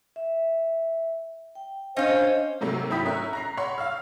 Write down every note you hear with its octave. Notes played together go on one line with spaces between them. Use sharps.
E5
G5
C#4 D4 C5 D#5 F5
G#2 C3 F#3 A3 A#3
G#1 F#3 E4 G5 D#6 B6
A3 C#4 A#4 E5 F#6
A#5 A#6 C7
C#5 F#5 B5 C6
F5 E6 F6